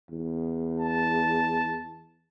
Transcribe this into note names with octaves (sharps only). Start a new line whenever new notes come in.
E2
A5